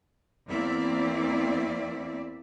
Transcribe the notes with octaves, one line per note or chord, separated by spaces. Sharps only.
E2 A#3 C4 E4 D5